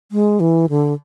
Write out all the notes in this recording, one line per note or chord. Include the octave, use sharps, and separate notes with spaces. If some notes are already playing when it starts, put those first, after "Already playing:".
G#3
E3
D3